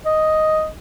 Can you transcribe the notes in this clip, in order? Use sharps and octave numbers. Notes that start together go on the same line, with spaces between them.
D#5